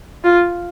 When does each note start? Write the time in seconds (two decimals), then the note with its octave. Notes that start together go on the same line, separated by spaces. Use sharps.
0.24 F4